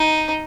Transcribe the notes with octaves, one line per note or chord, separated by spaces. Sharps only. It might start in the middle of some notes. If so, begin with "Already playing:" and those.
Already playing: D#4